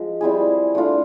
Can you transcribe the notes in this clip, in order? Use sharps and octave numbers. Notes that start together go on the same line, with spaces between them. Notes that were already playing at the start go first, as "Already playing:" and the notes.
Already playing: F3 G#3
G3 C4 E4 G#4
A3 D4 F4